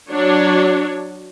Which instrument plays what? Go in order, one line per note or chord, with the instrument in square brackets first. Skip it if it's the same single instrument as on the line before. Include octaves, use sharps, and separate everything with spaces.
[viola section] F#3 D4 C#5